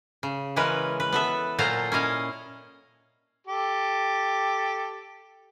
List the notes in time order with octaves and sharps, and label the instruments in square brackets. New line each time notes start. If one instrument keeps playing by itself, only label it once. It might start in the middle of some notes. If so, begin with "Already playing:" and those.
[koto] C#3
E3 G#3 C#4 A#4 B4
B4
B3 A4 E5
A#2 F#3 F4 A4 C5 A#5
C#4 E4 D#5 F5
[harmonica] G4 A4